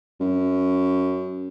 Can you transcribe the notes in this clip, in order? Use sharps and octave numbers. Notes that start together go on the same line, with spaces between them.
F#2